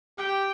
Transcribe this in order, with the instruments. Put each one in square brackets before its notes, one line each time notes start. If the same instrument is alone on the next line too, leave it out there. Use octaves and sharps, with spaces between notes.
[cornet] G4 [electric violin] G5